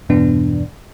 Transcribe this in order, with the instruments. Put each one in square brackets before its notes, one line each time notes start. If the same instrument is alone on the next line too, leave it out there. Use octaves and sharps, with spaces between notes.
[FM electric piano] E2 G2 B2 E3 B3 D4